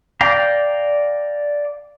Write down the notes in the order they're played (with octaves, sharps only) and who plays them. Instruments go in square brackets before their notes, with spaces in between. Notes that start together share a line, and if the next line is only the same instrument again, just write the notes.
[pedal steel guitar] D5 F5 G5 A#5